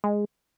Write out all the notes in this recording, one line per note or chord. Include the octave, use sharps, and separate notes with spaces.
G#3